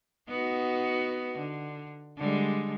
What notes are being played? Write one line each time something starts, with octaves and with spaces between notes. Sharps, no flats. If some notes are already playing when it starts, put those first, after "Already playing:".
B3 D#4 F#4
D3
D3 G3 G#3